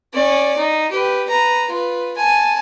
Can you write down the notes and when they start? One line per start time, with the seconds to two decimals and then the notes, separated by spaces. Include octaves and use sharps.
0.14 C#4 D5
0.57 D#4
0.91 G4 B4
1.30 B4 A#5
1.69 F4 B4
2.17 G#5 A5